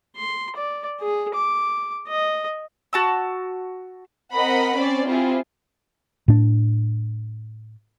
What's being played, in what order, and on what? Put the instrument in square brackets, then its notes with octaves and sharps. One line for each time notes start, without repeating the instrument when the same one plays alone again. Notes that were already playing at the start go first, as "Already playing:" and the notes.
[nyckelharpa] C6
D5
G#4
D6
D#5
[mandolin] F#4 A5 E6
[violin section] C4 A#4 D#5 F#5 B5
C4 C#4 C5 D5
C4 E4 F4 G4 G#4
[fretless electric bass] A2 D4